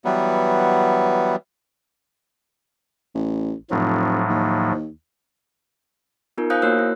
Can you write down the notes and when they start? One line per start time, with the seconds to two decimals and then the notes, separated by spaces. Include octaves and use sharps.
0.05 E3 F#3 G3 B3
3.15 A1
3.70 F1 A2 F3 F#3
4.29 D#2
6.38 B3 D#4 F4 A#4
6.50 C5 F5 G#5 D#6 F#6 G6
6.62 A#3 F#4 A#4 C#5 E6 F#6
6.79 E4